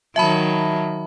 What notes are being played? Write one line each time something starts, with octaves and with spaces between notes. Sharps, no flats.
D#3 F#3 E5 A5 B5